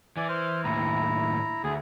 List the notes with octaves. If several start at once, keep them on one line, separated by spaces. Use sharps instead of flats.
E3 D5 G#5
C5 F6
D#2 A2 E4 A#5
D2 G#4